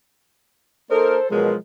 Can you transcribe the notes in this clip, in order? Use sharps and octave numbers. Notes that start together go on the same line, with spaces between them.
A#3 D#4 A4 A#4 C5
B2 F3 F#3 G#3 A#4